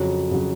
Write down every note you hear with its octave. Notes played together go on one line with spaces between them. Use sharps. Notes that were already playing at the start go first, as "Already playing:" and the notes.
Already playing: F2 C#3 F#3
C#3 F#3